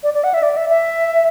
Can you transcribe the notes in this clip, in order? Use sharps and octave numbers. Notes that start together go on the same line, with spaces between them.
D5
D5
F#5
E5
D5
E5
E5